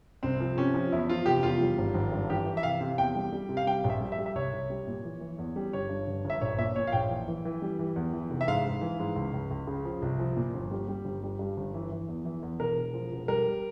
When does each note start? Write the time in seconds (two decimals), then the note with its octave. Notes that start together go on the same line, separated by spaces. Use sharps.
0.23 C2 C4
0.40 F3
0.57 C3 C#4
0.74 F3
0.92 E2 E4
1.09 F3 F4
1.26 F1 G4
1.43 E2 F4
1.61 G3
1.78 G#1
1.94 G#1
2.12 G2
2.29 E3 G4
2.46 E3
2.57 E5
2.63 C3 F5
2.81 C3
2.98 E2 G5
3.15 G3
3.32 G3
3.49 C3
3.57 F5
3.67 G3 G5
3.84 A#1
3.90 E5
4.01 G3
4.12 E5
4.18 G3
4.26 E5
4.35 C2 C#5
4.53 C2
4.70 G3
4.87 A#2
5.04 E3
5.21 E3
5.38 E2
5.56 G3
5.73 G1 C#5
5.89 G2
6.07 G1
6.25 G1 E5
6.41 A#1 C#5
6.58 A#2 E5
6.76 A#2 C#5
6.87 F5
6.93 A#1 G5
7.10 E3
7.28 E3
7.45 E3
7.62 G3
7.79 E3
7.96 E2
8.13 E3
8.31 F1
8.41 E5
8.48 G#2 F5
8.66 G#2
8.81 E3
9.00 G#2
9.16 C#2
9.34 C#2
9.51 C#2
9.67 C#3
9.85 F3
10.02 C2
10.19 F3
10.37 A#2
10.54 G1
10.71 G3
10.88 G3
11.05 G1
11.23 G3
11.39 G2
11.57 G1
11.74 E3
11.92 E3
12.08 E2
12.25 E3
12.43 E2
12.60 E1 A#4
12.77 E1
12.94 F3
13.12 E1
13.28 G3 A#4